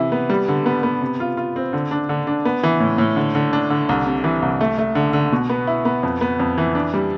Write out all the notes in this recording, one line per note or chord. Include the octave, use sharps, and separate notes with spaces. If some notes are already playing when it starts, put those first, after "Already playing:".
Already playing: C3 E3 E4
B3
G3
D3
B3
B3
C3
F4
F4
C4
D3
D4
D3
D4
B3
E3
A2
A2
D3
D3
D4
D3
C2
C3
E3
C2
A3
A3
D3
D3
B2
B3
E4
B3
F2
B3
F2
E3
D4
G3